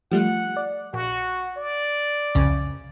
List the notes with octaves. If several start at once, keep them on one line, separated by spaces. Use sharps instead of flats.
F3 G3 A3 F#5
D5
A#1 F#4
D5
C2 F2 C#3